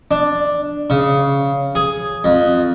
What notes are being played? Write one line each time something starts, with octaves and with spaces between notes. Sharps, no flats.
D4
C#3
G#4
F2